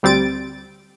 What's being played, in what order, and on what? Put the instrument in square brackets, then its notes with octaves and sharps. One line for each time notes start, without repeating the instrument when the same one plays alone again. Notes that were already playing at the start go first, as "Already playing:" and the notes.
[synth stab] D2 G3 C4 A6 D7